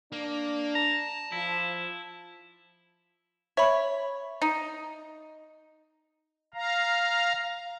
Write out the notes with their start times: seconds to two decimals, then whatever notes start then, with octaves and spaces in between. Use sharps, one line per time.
0.12 A#3 D4
0.75 A5 A#5
1.32 F3 E4
3.57 C#5 E5 B5
4.42 D#4
6.54 F5 A#5